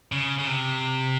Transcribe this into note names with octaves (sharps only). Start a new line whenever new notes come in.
C#3
C#3
C3